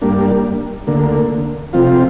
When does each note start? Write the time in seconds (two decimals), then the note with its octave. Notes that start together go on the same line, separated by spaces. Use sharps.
0.01 G2 G3 A#3 D4
0.87 D2 D3 A#3
1.73 C3 F3 C4 F4